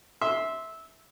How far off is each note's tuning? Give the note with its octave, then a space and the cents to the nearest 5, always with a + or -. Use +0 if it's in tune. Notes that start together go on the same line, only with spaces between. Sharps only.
E5 -15 C6 +0